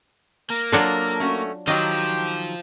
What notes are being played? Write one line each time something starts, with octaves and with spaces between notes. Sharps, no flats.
A#3 A#4
F#3 D4 F4 A4
A3 C#4 F#4
D#3 F#3 F4 G4 C5 D#5